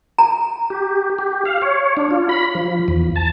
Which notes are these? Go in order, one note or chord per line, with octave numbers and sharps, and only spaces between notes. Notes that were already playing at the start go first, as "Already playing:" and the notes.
A#5
G4
G4
F5
C#5
D4
F4
B5
F3
E2
A5